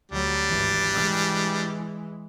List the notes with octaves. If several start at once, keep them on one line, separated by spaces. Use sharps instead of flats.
D2 F#3 G3 D4
G#1 E3
E3 G#3